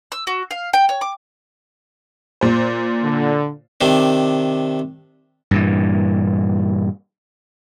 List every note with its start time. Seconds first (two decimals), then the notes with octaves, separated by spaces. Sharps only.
0.12 E6
0.27 F#4
0.51 F5
0.73 G5
0.89 C#5
1.01 D6
2.41 A#2 C5
3.03 D3
3.81 C3 D#3 D4
5.51 G2 A#2 E3